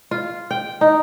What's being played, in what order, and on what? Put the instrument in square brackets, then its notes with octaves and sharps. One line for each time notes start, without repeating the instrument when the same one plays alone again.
[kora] F4
G5
D#4